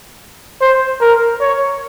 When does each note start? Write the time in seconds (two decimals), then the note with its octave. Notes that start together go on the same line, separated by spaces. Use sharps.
0.61 C5
1.01 A#4
1.41 C#5